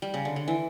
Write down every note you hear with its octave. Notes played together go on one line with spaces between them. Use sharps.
G3
C#3
D3
D3
E3